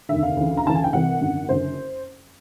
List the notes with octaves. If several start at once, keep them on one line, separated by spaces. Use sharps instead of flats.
F1 D#2 D3 E5
F5
D2 C#3 E3
A#5
D2 C#3 E3 A5
G#5
G5
C2 C3 E3 F#5
G#1 F#2 D3
F#1 F#2 D3 C5